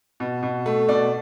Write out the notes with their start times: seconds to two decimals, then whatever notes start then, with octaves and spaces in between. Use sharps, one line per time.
0.20 B2
0.43 B2
0.66 A3
0.88 B2 D5